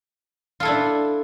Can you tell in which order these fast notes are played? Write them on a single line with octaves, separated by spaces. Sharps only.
F4 A4 E4 D4